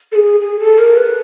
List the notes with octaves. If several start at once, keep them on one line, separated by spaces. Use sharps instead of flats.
A4
G#4
G#4
A4
A#4
B4